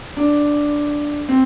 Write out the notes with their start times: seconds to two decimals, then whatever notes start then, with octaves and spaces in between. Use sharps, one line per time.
0.17 D4
1.29 C4